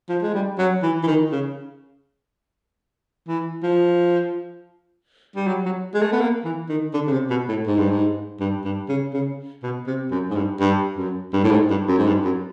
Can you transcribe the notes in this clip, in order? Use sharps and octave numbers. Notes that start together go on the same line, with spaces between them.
F3
G#3
G3
F#3
E3
E3
D#3
C#3
E3
F3
G3
F#3
F#3
G#3
A3
B3
A#3
E3
D#3
D3
C#3
C3
B2
A2
G#2
G2
G#2
G2
G2
C#3
C#3
B2
C3
F#2
G#2
G2
G2
F#2
G2
A2
G#2
G2
F#2
G#2
G2
F#2